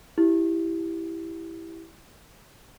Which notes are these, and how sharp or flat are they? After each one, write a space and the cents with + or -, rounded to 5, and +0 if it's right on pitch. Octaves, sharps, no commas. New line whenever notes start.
E4 +0 G4 -5